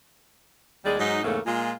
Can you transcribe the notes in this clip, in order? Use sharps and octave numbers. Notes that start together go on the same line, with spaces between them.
D#2 G3 G#3 G#4 D5
G#2 F#3 D#4
E2 G#2 C#3 A3 A#3
A#2 G#3 F4